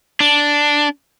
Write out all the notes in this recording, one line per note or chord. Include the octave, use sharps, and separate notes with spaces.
D4